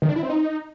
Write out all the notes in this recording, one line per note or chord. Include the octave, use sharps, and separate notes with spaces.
D#3
D4
E4
C4
D#4